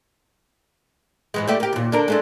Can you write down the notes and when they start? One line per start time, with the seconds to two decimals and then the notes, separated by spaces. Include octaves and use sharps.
1.34 G#2 E3 G#3
1.47 G3 A3 G4
1.60 A#3 G4
1.73 D#2 A#2
1.92 D3 D4 A#4
2.08 G#3 A3 D4